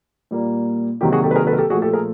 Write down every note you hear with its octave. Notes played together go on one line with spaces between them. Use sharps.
A#2 G3 A#3
C3 D#3 F#3 A#3 G4
F#4 G#4
G4 A4
B4
G#4 A#4
A4 B4
A#4
G4 A4
A#2 F3 A3 F#4 G#4
G4 A4
G#4 A#4